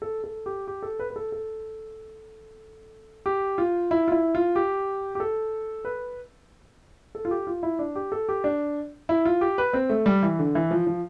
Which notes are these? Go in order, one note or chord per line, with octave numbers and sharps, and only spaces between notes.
A4
A4
G4
G4
A4
B4
B4
A4
A4
G4
F4
E4
F4
E4
F4
G4
G4
A4
B4
A4
F4
G4
F4
E4
D4
G4
A4
G4
D4
E4
F4
G4
B4
C4
A3
G3
E3
D3
E3
F3
F3